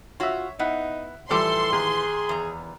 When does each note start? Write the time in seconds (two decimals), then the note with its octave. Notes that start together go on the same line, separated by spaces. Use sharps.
0.20 F4 F#4 C#5 E5
0.59 B3 D#4 E4 F#5
1.31 A2 E3 F3 G3 A4 C6 D6
1.72 D#2 G#4
2.29 E2 A#5